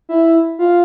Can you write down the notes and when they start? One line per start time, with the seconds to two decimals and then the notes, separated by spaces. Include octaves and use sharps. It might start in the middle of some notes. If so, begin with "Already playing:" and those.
0.09 E4
0.59 F4